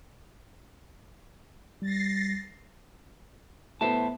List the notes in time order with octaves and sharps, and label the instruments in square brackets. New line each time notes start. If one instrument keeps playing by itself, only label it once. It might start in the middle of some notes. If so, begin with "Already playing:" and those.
[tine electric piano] G3 [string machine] A6 A#6 C7
[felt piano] A2 A3 B3 [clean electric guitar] C5 E5 A5